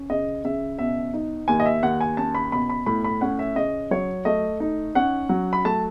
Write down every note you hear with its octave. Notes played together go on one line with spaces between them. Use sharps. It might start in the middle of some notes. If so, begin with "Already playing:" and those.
Already playing: C#4
C#3 D#5
C#3 E5
B2 E5
D#4
D#2 G#5
D#5
E5
D#2 F#5
G#5
C#4 A5
B5
B2 B5
B5
A2 B5
B5
C#4 F#5
E5
C#3 D#5
F#3 C#5
A3 D#5
D#4
C#4 F#5
F#3
B5
A3 A5